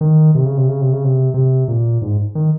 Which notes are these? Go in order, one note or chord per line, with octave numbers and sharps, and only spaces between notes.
D#3
C3
C#3
C3
C#3
C3
C#3
C3
C3
A#2
G#2
D#3